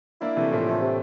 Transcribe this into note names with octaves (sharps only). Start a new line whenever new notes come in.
A#3 D4 E4
C3 E3 A3
A2 F3
A3
C3